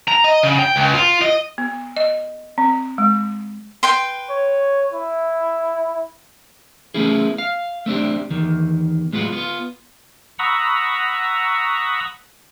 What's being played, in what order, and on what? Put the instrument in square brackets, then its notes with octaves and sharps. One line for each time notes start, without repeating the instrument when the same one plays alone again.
[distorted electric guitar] A#5
D#5
C#3
G5
C#2
F4
D#5
[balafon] B3
D#5
C4
G#3
[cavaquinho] B4 G5 C6
[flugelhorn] C#5
E4
[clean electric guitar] A3 B3 C#4 E4 G#4
F5
A3 C4 D4 G4
E2 D#3
A2 G#3 B3 F4 F#4
B3 F4
[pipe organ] F#5 A#5 B5 C#6 D#6 E6